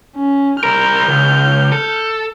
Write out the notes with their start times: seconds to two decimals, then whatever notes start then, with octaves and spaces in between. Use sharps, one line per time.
0.16 C#4
0.64 C2 A#4 F6 G6
1.08 C#2
1.72 A4